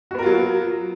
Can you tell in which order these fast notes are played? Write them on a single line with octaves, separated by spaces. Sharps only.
F#4 B3 A#4 F4 F#3